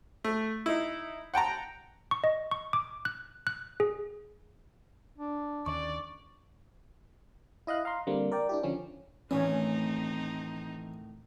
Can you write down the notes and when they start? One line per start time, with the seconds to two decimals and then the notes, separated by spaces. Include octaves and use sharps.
0.24 A3
0.66 D#4 E4
1.34 F#5 G5 A5 A#5
2.11 C#6
2.24 D#5
2.51 C#6
2.73 D6
3.05 F#6
3.47 F#6
3.80 G#4
5.18 D4
5.66 D#2 D3 C#4 D5 C#6
7.67 E4 D#5 F5 F#6
7.85 F5 A#5 C6
8.07 D3 G3 A#3 C4
8.32 A#4 D5 G5
8.49 D4 E4 G4
8.63 D3 F3 C#4
9.31 D2 A2 D#3 E3 C4 C#4 D#4